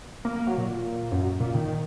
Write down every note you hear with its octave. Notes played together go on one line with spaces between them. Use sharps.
A#3
A#3
F#3
A#2
F#2
A#2
D#3